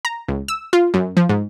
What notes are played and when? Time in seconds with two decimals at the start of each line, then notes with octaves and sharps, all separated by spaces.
0.05 A#5
0.28 C#2
0.48 E6
0.73 F4
0.94 F#2
1.17 F3
1.29 G#2